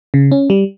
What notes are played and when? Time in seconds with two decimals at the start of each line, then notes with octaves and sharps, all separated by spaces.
0.14 C#3
0.32 C#4
0.50 G3